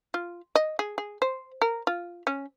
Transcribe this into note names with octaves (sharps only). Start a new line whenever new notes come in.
F4
D#5
G#4
G#4
C5
A#4
F4
C#4